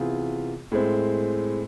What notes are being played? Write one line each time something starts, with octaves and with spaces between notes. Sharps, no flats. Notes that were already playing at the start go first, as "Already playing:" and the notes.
Already playing: C3 E3 B3 F4 G#4
A2 G#3 C4